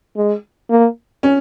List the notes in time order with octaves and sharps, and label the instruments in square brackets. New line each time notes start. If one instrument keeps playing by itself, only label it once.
[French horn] G#3
A#3
[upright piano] C#4